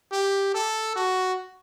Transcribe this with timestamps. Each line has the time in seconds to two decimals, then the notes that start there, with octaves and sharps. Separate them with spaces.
0.12 G4
0.54 A4
0.96 F#4